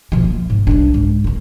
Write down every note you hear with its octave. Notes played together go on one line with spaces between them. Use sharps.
B2 F3
A#3
G#2
C2 D4
G#2
C#2 A#3